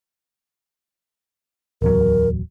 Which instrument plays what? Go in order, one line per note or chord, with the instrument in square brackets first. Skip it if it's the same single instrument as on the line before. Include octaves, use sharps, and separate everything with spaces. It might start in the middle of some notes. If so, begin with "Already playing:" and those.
[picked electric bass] D1 E2 F#3 [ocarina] A#4